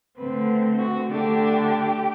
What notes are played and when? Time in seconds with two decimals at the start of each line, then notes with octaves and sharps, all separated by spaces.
0.18 D3 A3 C4 B4
0.79 F#4
1.10 D3 A3 D4 G4